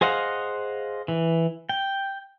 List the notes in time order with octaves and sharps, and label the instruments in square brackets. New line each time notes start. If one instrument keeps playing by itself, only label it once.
[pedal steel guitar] G#4 C5 D#5 F5 F#5
E3
G5